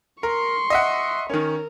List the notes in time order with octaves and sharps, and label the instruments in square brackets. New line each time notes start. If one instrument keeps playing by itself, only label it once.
[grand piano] A#4 [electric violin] C6 C#6
[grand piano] D#5 E5 F#5
[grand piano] D#3 C#4 [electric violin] A#4